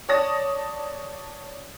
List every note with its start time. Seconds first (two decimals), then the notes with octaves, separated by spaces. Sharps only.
0.09 C#5 D5 A5 D#6 A#6